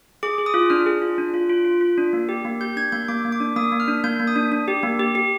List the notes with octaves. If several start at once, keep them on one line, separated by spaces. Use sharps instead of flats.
G#4 D6
G#4
D#6
F4
D4 F6
G#4
F4
D4
F4
F4
F4
F4
D4
A#3
G4
A#3
G4 G6
D4 G#6
A#3 G6
A#3 D6
A#3
D6
D4
A#3 D#6
A#3
F6
D4
A#3 G6
A#3
D#6
D4
D4
G4
A#3
G4
G4